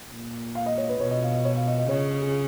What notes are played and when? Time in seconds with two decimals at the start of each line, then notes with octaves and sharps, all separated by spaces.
0.11 A#2
0.55 F5
0.66 D#5
0.78 C#5
0.89 B4
1.00 B2 C#5
1.11 D#5
1.22 F5
1.34 D#5
1.45 C#5
1.55 F5
1.67 D#5
1.78 D#5
1.89 C#3 C#5
2.22 G#4